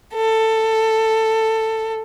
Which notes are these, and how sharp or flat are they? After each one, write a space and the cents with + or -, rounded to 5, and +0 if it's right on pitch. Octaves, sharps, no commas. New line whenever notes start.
A4 +15